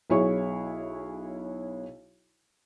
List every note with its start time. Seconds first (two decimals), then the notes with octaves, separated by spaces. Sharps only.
0.10 B1 E4 G#4 C#5 C#6